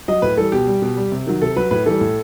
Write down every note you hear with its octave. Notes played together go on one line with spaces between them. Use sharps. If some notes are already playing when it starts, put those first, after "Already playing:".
F#3 D#5
A2 B4
E3 G3 A4
B2 G4
G3
B2
G3
C3
D#3 F#3
C3 A4
F#3 B4
A2 B4
E3 G3 A4
A2